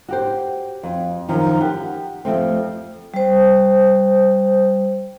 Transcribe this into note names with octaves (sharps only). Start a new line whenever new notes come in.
F#4 G4 C5
F2
F#2 D#3 F3
G4 F#5
F2 F3 A3 C4
G3 C5